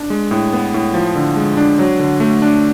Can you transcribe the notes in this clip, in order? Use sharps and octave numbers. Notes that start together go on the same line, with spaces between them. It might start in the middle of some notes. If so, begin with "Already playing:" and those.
Already playing: D4
G#3
A2
B3
A2
F3
D3
G#3
D4
F#3
D3
A3
D4